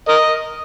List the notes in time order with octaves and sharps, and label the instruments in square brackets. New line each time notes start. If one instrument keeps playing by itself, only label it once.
[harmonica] A#4 D#5